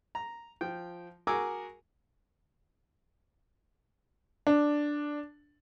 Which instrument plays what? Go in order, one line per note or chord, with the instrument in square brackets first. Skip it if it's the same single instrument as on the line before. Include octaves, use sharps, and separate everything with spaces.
[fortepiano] A#5
F3 G5
F#4 G#4 A#4 G#5 D6 E6
[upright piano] D4